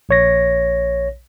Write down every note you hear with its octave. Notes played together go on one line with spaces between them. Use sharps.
A#1 C#5 A#6